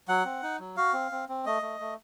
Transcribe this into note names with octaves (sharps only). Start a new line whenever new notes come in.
F#3 F#5
C4
D#4
F#3
F#4 F5
C4
C4
C4
A3 D#5
A3
A3